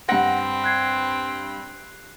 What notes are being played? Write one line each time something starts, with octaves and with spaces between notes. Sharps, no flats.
G2 C4 F#5 A#6
F#6 G#6 C7